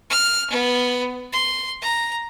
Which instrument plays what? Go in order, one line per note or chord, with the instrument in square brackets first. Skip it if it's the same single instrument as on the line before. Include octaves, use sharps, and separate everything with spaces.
[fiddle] F6
B3
C6
A#5